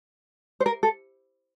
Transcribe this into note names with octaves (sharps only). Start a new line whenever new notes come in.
C5
A#4
A4